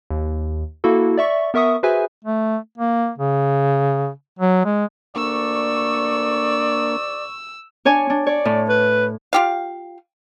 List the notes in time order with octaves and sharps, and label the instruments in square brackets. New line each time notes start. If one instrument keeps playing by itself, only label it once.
[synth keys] D#2
A#3 E4 F#4 A4
D5 E5 C#6
B3 A#4 E5 C#6 D#6
F#4 G#4 B4 C5 E5 G#5
[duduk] A3
A#3
C#3
F#3
G#3
[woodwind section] D2 C#6 [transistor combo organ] A#3 D4 [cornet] D5 [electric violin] E6
[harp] D4 C#5 G#5
D4
[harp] C#5 [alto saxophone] D5
[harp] A2
[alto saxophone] B4
[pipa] F4 G4 F5